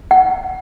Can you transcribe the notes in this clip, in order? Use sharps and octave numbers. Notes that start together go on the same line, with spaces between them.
F#5